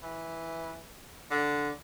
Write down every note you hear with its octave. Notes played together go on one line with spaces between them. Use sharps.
E3
D3